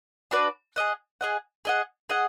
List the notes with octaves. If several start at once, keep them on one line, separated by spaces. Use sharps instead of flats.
D4 F#4 B4 D5
G#4 D#5 F#5
G#4 D#5 F#5
G#4 D#5 F#5
G#4 D#5 F#5